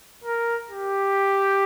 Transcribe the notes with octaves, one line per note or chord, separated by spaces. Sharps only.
A#4
G4